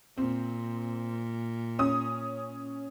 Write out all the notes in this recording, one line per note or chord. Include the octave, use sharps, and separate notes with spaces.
A#2 C4
C#4 D#6